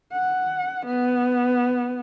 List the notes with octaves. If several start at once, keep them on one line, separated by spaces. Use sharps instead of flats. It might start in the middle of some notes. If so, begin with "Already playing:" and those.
F#5
B3